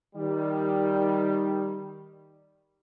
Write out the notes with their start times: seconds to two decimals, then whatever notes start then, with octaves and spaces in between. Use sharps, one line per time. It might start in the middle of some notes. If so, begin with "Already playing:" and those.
0.15 D#3 G3